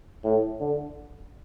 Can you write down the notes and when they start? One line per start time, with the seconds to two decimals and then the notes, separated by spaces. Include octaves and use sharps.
0.25 A2
0.60 D3